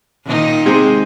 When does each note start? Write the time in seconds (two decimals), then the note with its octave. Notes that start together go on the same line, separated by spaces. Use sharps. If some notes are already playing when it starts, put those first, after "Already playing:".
0.25 A#2 D#3 D#4
0.65 C3 G#3 C4